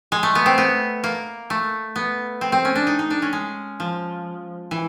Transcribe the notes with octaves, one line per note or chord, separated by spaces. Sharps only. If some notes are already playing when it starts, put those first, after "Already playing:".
G#3
A3
B3
C4
B3
A#3
A3
B3
C4
C4
C#4
D4
D#4
D#4
D4
C#4
G#3
F3
E3